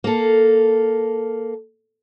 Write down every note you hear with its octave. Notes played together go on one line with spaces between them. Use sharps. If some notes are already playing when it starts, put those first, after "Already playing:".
A#3 A4